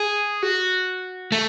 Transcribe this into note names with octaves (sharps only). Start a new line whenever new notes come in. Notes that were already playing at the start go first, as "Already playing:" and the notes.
Already playing: G#4
F#4
A3